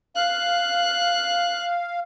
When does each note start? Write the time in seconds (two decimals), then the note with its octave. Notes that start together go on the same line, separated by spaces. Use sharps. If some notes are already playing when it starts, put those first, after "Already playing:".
0.16 F5 F#6